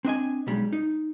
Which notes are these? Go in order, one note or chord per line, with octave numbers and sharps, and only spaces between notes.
C4 D4 D#5 G#5
B1 G3 G#3
D#4